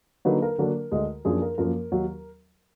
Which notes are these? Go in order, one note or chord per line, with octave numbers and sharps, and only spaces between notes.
D3 F#3 A#3 D#4 B4
A#4
D3 F#3 A#3 D4 A#4
D2 D3 G#3
F#2 F3 A#3 D4 G#4
A#4
F#2 F3 A#3 A#4
D#2 D#3 F#3